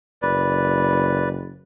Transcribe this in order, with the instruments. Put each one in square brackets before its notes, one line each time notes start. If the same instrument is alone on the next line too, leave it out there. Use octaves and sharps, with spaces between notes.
[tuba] F#1 [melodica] B4 D5